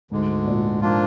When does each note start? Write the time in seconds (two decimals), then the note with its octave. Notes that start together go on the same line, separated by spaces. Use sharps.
0.11 D2 G#2 D3 G#3
0.46 A#2
0.81 G#2 F3 A#3 D4 F4